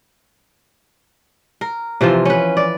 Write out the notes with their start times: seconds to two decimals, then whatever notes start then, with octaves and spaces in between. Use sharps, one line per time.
1.61 A#4
2.01 C3 E3 F3 F4
2.25 C#4 B4
2.57 D5